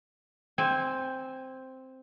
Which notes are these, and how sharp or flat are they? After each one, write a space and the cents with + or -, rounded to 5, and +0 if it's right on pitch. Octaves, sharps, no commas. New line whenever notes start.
C4 +0 G#5 -20